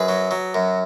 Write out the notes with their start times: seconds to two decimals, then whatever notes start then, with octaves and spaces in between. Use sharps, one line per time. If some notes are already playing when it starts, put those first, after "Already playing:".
Already playing: F#2 G#4 B4
0.09 F#3
0.31 F#3
0.54 F#2